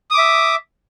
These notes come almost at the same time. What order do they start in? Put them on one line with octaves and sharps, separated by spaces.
D#6 D6 E5